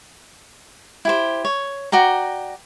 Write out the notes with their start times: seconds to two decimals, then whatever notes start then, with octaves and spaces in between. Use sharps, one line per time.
1.05 E4 G4 C5
1.45 C#5
1.92 F#4 D5 G5 A#5